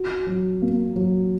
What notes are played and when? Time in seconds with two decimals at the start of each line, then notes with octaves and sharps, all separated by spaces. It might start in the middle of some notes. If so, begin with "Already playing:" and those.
Already playing: F#4
0.26 F#3
0.62 A#3
0.96 F#3